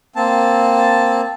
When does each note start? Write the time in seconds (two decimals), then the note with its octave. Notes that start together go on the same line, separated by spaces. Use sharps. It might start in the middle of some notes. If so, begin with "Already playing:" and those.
0.16 A#3 C4 A5